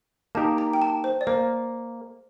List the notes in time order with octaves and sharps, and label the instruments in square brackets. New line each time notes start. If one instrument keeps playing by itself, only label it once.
[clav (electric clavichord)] A#3 D#4 G4 A#4 [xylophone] A5
[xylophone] A#5
G5
A5
C5
D5
[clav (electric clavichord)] A#3 [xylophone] C5